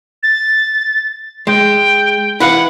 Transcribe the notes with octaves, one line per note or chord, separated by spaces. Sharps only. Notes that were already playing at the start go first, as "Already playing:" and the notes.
A6
G#3 G5
E4 B4 F5 F#5